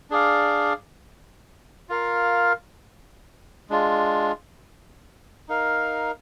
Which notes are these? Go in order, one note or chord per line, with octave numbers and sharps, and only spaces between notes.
D4 G#4 D5 F5
F4 A#4 F5
G#3 D4 F4
D#4 A#4 F5